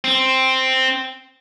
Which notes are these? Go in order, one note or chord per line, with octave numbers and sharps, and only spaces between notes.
C4